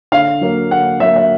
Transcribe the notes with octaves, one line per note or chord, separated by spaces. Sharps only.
D3 F5
F#3 A#3
D3 F#5
F#3 A#3 E5
E5